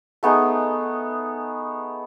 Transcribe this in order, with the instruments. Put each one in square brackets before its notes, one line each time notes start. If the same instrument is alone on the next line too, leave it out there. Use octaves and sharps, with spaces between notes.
[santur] A3 B3 D#4 G#4